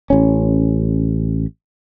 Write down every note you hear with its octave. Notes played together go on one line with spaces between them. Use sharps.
A1 C#4